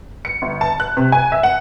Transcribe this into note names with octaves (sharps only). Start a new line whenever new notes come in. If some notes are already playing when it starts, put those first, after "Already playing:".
C#7
G1
A5
F#6
C3
G#5
E5
F#5